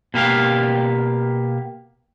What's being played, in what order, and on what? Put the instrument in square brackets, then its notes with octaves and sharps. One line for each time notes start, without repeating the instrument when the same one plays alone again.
[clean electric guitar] B2 A#3 G4 F5